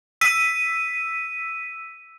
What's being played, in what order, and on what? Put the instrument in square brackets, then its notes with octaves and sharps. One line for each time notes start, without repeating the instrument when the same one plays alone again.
[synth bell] E6 B6 D#7